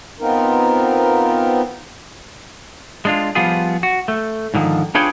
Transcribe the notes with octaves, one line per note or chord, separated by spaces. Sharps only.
B3 C4 D#4 F4 A#4
G#3 D4 F4
F3 G3 B3 F4 G#4
F#4
A3
G#2 D3 D#3 F3
D4 F4 G#4 B4 C#5 G5